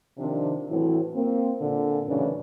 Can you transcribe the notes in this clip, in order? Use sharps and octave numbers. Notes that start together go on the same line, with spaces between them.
C3 D#3 F3 C4 D4
A2 E3 F#3 C4 E4
A#3 C4
A#2 D3
F#2 A2 C#3 E3 D4 B4